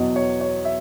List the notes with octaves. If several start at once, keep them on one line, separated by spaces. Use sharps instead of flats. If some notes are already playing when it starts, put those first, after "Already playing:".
Already playing: E2 B2 F#3 D#5
C#5
C#5
E5